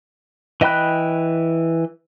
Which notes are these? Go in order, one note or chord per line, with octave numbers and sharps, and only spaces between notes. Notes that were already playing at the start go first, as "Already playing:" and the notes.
E3 D#5 G5 B5 F#6